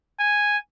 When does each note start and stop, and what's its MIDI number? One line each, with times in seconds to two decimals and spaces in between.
0.19 0.58 80